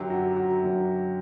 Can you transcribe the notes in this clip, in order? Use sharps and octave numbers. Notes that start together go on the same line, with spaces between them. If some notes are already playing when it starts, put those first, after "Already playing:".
Already playing: F#2 D3 F#3 G4
F#4
F#4
F#2 D3 F#3